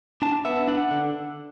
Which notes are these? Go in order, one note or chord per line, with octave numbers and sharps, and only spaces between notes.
D4 A5
B3 E5
D4 F#5
D3